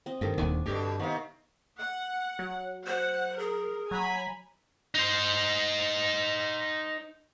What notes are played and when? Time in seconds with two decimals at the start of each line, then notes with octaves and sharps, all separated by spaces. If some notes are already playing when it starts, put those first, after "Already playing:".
0.06 C4 D#5
0.21 G2 D#3 A4 G5
0.38 D#1 D#2 D#3 D4 G#5
0.66 G2 B2 D3 G4
0.99 C3 D#3 B3 F5
1.79 F#5
2.39 F#3
2.86 C5 F#5
3.39 G#4 A#4
3.91 F#3 G#5 A#5 B5
4.95 D#4 C5